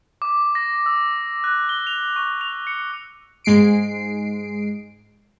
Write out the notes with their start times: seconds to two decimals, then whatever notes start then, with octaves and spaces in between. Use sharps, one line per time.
0.22 D6
0.55 A#6
0.86 E6
1.44 F#6
1.69 G7
1.87 F7
2.16 C#6
2.41 F7
2.67 C#7
3.44 G#2 G#3 C7 D7